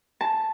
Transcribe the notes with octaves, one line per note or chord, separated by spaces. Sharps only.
A5